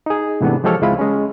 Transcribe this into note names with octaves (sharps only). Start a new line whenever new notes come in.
D#4 G#4
G#2 C3 E3 A3 B3 D4
F3 G#3 G4 A4 C#5 F6
C#2 G#3 C4 E4 F4 B5
G#3 C#4